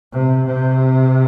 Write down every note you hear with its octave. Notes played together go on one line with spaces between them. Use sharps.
C3
C3